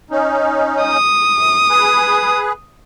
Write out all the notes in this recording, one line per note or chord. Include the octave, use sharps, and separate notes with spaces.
C#4 D#4
D#6
F#2
G#4 B4